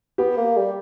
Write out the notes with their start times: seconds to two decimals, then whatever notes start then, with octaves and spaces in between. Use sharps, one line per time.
0.18 B3 G4
0.37 A#3
0.57 G3